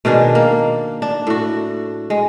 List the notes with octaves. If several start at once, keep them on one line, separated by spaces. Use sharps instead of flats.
B2 D#3 G#3 D4
A#3
D4
A2 F#4
G#3